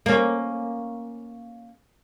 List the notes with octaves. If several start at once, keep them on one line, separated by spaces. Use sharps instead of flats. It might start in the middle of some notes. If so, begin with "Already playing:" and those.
A#3 C#4